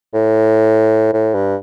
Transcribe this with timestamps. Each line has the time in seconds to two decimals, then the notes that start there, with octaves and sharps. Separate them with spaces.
0.14 A2
1.13 A2
1.34 G2